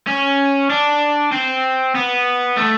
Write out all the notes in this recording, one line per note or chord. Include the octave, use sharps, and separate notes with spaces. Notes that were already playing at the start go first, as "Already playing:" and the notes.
C#4
D4
C4
B3
A3